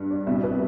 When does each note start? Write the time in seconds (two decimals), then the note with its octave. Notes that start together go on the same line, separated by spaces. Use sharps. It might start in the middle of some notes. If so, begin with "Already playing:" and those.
Already playing: G2
0.10 D5
0.26 C2 B2 E5
0.43 B4